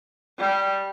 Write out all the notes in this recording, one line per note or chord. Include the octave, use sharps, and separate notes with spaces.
G3